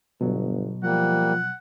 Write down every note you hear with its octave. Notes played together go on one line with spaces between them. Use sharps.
G1 B2 F#3
F3 G3 A#3 F#5